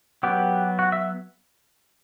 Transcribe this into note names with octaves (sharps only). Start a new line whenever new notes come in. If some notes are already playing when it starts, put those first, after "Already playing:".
F#3 B3 G4
F#4
E5